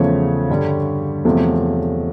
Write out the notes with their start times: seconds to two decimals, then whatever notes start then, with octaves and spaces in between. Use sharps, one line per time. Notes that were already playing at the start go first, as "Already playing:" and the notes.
Already playing: E2 C#3 F3 A3 C#5
0.50 G2 D3 G3
1.25 E2 C3 F3 A3